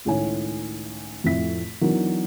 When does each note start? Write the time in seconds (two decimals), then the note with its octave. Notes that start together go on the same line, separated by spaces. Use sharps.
0.05 C#2 A2 D#3 C#5 G#5
1.23 F1 F2 A2 C4 E5 B6
1.81 E3 F#3 B3 D4 D#4 A#4